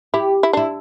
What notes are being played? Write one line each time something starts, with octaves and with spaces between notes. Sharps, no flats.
E4 G4
E4
D4 E4